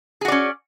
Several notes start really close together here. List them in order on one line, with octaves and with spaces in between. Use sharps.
G#4 F#4 D5 C#4